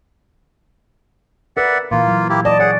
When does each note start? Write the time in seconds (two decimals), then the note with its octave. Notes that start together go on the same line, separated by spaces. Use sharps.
1.57 A#4 B4 D5 E5 F#5
1.91 A#2 E3 A#3 F4
2.08 F#3
2.29 A#3 E4 G4
2.45 D5 D#5 A5
2.60 G#4 C#5 F#5